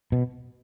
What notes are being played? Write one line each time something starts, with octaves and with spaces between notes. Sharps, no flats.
B2